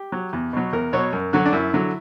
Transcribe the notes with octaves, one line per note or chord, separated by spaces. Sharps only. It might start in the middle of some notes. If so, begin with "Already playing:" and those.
Already playing: G4
F#3
E2
B2 F#3
E2 A#4
B2 F#3 C#5
F#2 A#4
D3 F#3 F#4
D4
F#2 E4
D3 F#3